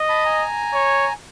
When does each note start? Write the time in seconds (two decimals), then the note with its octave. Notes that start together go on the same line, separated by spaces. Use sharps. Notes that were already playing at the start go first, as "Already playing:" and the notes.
Already playing: D#5
0.09 A5 B5
0.25 G#5 A#5
0.74 C#5